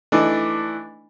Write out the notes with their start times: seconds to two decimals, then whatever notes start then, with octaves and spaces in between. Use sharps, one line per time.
0.12 E3 A3 D4 D#4